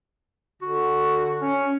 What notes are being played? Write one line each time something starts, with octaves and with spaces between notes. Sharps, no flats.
D3 F#4
C#4